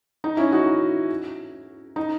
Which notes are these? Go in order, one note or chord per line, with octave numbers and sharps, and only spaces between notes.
D#4
C#4 E4
D#4 F#4
D#4